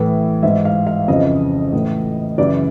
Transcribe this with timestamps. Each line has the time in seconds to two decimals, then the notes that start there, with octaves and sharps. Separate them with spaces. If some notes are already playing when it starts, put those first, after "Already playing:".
Already playing: A2 E3
0.43 G#2 E3 E5
0.65 F5
0.87 F5
1.08 F2 C#3 E3 D#5
1.73 A2 E3
2.38 F#2 C#3 E3 D5